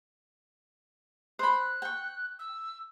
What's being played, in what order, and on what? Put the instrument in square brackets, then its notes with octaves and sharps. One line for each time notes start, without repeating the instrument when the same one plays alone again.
[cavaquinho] C5 B5 [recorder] F#6
[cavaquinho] G5 C#6
[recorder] E6